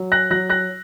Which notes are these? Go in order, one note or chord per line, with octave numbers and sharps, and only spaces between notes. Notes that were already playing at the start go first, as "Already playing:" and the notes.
Already playing: F#3
F#6 A#6
F#3 F#6 A#6
F#6 A#6